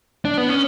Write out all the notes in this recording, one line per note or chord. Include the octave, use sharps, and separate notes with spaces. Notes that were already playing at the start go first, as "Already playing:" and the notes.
D4
B3
C#4